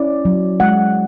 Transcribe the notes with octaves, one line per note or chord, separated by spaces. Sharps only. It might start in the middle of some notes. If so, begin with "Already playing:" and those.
Already playing: C#4 E4 D5
F#3
G#3 F#5